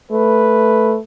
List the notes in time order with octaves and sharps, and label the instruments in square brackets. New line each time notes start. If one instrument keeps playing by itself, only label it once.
[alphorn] A3 [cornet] B4